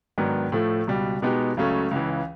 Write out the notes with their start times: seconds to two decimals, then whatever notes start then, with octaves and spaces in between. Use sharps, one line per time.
0.18 G#2 D#3 F#3 B3 D4
0.52 A2 F3 A3
0.87 C#2 B2 G3
1.22 B2 G#3 B3 D#4 G4
1.57 C#2 C#3 F#3 A3 C#4
1.91 C#2 C#3 E3